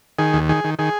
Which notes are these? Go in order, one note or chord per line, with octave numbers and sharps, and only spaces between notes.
D#3 G#4
D#2
D#3 G#4
D#3
D#3 G#4